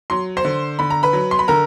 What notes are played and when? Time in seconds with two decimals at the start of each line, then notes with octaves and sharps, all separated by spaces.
0.10 F#3 C6
0.37 C5 C6
0.45 D3
0.79 D3 B5
0.90 A#5
1.03 B4 B5
1.13 F#3
1.31 C6
1.39 B5
1.48 D3 A#4 A#5